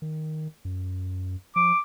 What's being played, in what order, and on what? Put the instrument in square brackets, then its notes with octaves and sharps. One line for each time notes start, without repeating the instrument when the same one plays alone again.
[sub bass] D#3
F#2
[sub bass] F3 [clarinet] D6